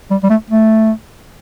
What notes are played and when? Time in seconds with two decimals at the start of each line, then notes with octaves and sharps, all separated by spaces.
0.11 G3
0.23 G3
0.30 A3
0.50 A3